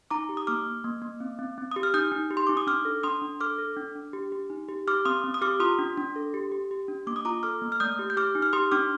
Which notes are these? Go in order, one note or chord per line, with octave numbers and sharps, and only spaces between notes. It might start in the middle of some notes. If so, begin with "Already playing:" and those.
D#4 A#5 D6
G4
D#6
A#3 D6 F6
A#3
A#3
A#3
C4
C4
C4
G4 D#6
F6
D#4 D#6 G6
D#4
G4
C6
D#4 D6
D#6
D4 D6 F6
A4
D4 C6 D#6
D4
A4 D6 F6
A4
D4
D4
G4
G4
D#4
G4
G4 D6 F6
C4 C6 D#6
C4
D#6
G4 D6 F6
F4 C6 D#6
D4
D4
A4
G4
G4
G4
D4
A#3 D6
D#6
F4 A#5 D6
A4 D6 F6
A#3
F6
A3 D#6 G6
G4
G6
G4 D6 F6
D#4
F6
G4 C6 D#6
D4 D6 F6